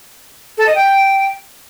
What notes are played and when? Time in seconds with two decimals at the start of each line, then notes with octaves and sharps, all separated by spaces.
0.58 A4
0.67 D#5
0.75 G5